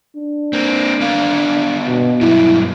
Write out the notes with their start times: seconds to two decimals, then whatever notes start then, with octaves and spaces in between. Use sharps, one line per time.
0.16 D4
0.53 A#3 C4
1.01 D3 B3 F5
1.86 B2
2.21 G2 B2 F#3 E4